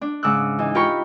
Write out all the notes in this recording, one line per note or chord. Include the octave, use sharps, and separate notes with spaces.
D4
G#2 C#3 D6 E6 F#6
E3 D#4
F4 G4 A#4 G5 B5 C#6